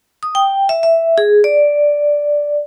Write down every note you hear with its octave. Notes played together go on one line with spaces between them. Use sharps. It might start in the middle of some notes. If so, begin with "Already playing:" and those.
D#6
G5
E5
E5
G#4
D5